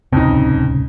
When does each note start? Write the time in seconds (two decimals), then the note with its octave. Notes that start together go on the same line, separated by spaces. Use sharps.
0.13 D1 C2 F2 C#3 D#4